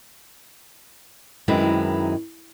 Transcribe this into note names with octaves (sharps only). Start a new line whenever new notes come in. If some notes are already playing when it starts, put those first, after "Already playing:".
F#2 D#3 G#3 C4 E4 B4